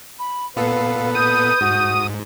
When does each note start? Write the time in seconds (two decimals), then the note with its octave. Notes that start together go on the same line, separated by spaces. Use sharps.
0.19 B5
0.56 A#2 B3 A4 B4 F5
1.15 D#6 G6
1.61 G#2 F#4